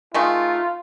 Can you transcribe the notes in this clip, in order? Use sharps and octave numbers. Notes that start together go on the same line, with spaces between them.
D#3 G#3 A3 F4